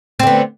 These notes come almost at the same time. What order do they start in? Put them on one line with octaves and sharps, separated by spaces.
C4 D3 B3